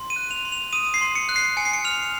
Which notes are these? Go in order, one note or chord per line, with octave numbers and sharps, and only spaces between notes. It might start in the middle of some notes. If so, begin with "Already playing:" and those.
Already playing: C6
D#7
F#6
F7
C6
F7
D#6 D#7
C7
C6
C#7
F#6
C7
G#5 C#7
C7
C#7
F6 F7